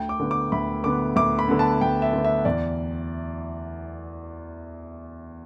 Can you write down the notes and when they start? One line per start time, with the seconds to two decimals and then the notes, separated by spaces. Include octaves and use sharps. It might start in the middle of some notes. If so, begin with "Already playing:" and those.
Already playing: D2 G5
0.09 D6
0.20 D3 B3
0.31 D6
0.52 D2 B5
0.84 D3 B3 D6
1.16 D2 D6
1.39 B5
1.48 D3 B3
1.59 A5
1.81 D2 G5
2.02 E5
2.13 D3 B3
2.24 E5
2.45 E2 D5